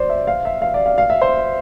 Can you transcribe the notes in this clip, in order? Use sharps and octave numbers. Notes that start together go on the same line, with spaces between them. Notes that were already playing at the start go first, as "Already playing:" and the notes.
Already playing: C5 D5
E5
F5
E5
F5
D5
F5
F5
E5
C5